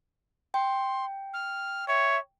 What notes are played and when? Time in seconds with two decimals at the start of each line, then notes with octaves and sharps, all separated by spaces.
0.54 G5 C6
1.33 F6
1.88 C#5 E5